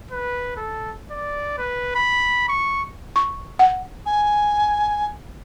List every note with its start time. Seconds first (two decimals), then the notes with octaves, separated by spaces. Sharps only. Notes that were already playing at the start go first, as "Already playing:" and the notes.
0.11 B4
0.57 A4
1.11 D5
1.58 B4
1.95 B5
2.49 C#6
3.16 C#6
3.59 F#5
4.06 G#5